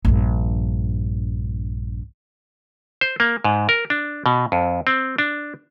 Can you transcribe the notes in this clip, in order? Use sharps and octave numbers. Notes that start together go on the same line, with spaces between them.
A#1 G2
C5
A#3
G#2
A#4
D4
B2
F2
C4
D4